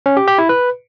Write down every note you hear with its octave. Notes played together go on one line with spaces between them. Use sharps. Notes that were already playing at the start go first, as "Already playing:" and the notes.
C#4
G4
G4
E4
B4